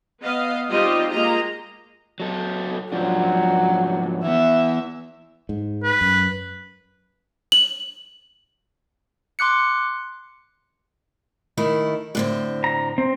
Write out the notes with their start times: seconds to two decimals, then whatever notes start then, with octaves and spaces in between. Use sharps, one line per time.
0.21 B3 D#5 F5
0.69 G3 C4 D#4 F4 G4 D#5
1.11 G#3 A#3 F4 G4 D#5 A#5
2.20 F#3 A4
2.92 G#2 F3 F#3 D4
4.24 E3 B3 E5
5.49 G#2
5.84 B4
6.01 F#2
7.52 F#7
9.39 C6 D6 F#6 C#7
11.57 D#3 A3 E4
12.15 A2 D3 C4
12.64 A#5
12.98 C4